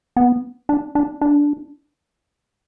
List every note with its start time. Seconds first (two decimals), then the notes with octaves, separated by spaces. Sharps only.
0.16 B3
0.69 D4
0.95 D4
1.21 D4